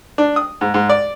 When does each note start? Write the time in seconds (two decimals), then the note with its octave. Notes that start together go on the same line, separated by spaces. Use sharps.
0.18 D4
0.36 D#6
0.61 G#2
0.74 G#2
0.89 D5